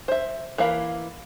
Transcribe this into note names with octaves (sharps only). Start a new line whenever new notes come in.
C5 E5
E3 A#3 F5 B5